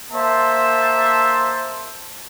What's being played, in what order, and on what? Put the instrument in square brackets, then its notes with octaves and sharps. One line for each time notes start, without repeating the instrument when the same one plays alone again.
[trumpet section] A#3 C5 E5 A5